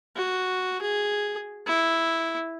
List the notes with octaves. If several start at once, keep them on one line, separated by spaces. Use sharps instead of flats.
F#4
G#4
E4